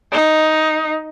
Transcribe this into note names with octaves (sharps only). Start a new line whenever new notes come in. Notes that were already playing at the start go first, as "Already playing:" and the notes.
D#4